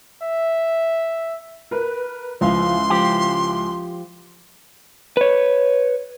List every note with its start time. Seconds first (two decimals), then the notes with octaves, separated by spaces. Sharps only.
0.22 E5
1.71 A#4 B4
2.41 C#2 F3 E4 F5 C6
2.90 F3 G4
5.17 B4 C#5